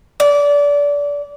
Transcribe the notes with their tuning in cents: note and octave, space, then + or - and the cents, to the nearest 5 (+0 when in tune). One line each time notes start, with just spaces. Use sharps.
D5 -25